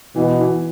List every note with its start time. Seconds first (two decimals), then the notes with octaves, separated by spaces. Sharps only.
0.16 B2 E3
0.40 E3